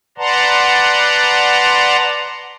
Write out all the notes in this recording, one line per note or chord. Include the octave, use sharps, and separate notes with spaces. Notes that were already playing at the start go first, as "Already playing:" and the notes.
B4 D5 F#5 A5 A#5 C6